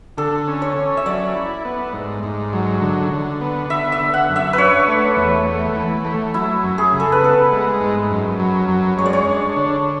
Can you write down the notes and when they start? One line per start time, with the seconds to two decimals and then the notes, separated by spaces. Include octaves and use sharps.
0.17 D3 A4
0.48 C#4
0.62 C#5
0.77 C#4
0.97 E5
1.06 F#3 D5
1.35 E4
1.65 B3
1.93 G#2
2.23 G#2
2.53 F#3
2.82 D3
3.12 D3
3.41 B3
3.70 D3 E5
3.92 E5
3.99 D3
4.14 F#5
4.29 F#2
4.36 E5
4.53 D4 B4 C#5
4.87 A3
5.17 E2
5.46 A3
5.76 E3
6.05 A3
6.34 F#3 E4
6.63 F#2
6.78 G#4
6.92 C#3
7.00 A4
7.12 B4
7.22 B3 A4
7.52 G#3
7.81 G#2
8.11 F#2
8.40 F#3
8.68 F#2
8.98 G#3 C#5
9.06 D5
9.13 C#5
9.27 D4
9.56 D3